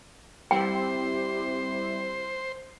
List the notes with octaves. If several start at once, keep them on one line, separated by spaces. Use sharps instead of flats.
G3 C4 E4 G4 C5 G5